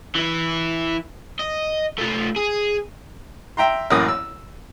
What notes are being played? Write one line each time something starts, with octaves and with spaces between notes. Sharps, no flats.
E3 E4
D#5
A3 F4
G#4
E5 G5 A#5 C6
A1 F#2 A2 A#3 D#6
E6